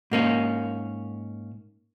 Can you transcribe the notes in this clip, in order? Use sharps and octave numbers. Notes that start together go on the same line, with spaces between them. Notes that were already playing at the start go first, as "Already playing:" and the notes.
G#2 A#3 C#4